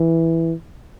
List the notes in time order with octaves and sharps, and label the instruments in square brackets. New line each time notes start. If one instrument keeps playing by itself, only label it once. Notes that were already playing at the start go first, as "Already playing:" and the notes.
Already playing: [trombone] E3